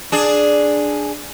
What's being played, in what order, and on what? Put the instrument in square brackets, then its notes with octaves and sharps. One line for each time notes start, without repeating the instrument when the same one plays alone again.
[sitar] D4 G#4